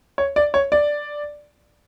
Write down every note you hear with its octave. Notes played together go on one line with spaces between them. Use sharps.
C#5
D5
C#5
D5